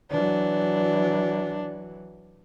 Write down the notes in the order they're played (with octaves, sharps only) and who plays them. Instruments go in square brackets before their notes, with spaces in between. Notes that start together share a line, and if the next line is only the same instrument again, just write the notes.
[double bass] E3 F#3 [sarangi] D4